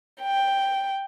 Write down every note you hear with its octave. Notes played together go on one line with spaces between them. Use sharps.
G5